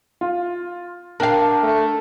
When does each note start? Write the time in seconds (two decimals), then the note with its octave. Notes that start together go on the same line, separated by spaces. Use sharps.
0.21 F4
1.20 D4 A#4 F5 G5
1.63 A3